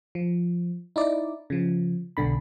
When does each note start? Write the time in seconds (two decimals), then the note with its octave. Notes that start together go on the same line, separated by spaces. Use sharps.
0.15 F3
0.96 D#4 E4 D5
1.50 C#3 F3
2.17 B1 D3 B5